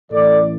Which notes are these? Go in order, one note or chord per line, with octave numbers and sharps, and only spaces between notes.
A1 A2 E3 A4 D5